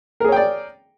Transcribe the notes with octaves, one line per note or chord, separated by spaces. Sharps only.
G#4 A#4 C#5 D5 G5